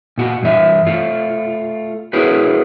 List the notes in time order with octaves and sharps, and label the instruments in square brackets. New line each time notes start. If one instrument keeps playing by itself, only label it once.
[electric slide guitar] A#2 F#4
G2 E3 E5
A3 F4
E4 F#4 G#4 A#4 B4 C#5